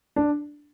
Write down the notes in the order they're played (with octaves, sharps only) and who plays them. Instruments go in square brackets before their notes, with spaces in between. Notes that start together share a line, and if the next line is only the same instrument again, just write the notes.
[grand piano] D4